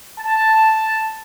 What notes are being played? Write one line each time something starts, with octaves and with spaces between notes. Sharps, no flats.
A5